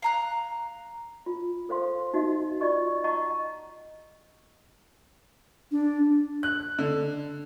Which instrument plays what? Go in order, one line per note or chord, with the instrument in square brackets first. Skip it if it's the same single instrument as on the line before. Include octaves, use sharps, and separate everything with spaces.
[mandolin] F5 A#5 F#6
[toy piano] F4
A4 C5 F5 C6
D#4 F#4 D#5 E5
F4 D5 D#5 C#6
D#5 F#5 A5 A#5 C#6 D6
[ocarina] D4
[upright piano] F#6
D3